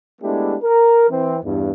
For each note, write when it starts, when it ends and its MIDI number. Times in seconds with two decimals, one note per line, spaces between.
0.22 0.55 56
0.22 0.55 57
0.22 0.55 59
0.22 0.55 62
0.22 0.55 64
0.22 0.55 67
0.62 1.08 70
1.09 1.37 52
1.09 1.37 60
1.43 1.72 40
1.43 1.72 43